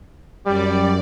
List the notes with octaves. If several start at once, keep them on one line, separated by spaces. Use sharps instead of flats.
F#2 G3 D5